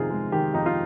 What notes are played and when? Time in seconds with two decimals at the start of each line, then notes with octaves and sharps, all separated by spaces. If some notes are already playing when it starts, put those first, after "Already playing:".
Already playing: F2 C3 D#3 D#4 F4 G#4
0.10 G#3
0.32 D#3 G4
0.54 F2 D#4
0.66 F4